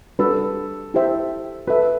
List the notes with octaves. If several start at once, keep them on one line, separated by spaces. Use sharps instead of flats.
G3 D4 F#4 A4 B4
E4 G4 C5 E5 G5
F#4 A4 B4 E5